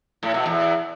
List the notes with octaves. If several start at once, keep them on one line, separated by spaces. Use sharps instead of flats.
A2
B2
E2